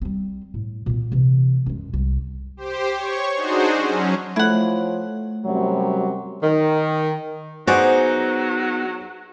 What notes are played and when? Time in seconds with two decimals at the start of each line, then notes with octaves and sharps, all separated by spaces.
0.02 G3 C4
0.54 A2
0.86 A#2 B3
1.12 C3 E3
1.66 F#2 G#3
1.93 C2
2.57 G4 C5
2.94 C#5 C#6
3.34 D4 D#4 F#4 G#4 C5
3.72 F#3 C#4
4.36 F3 A3 E4 C#5 F#5
5.45 F#2 C3 F#3 G3
6.43 D#3
7.67 F#3 B3 D#4 F#4 G#4 C5 D5